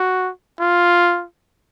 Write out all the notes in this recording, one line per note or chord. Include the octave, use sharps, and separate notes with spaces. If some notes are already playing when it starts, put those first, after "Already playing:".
Already playing: F#4
F4